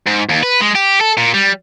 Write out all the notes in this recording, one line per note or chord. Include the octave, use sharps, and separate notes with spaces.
G#2
D#2
B4
G#3
G4
A4
A#2
G3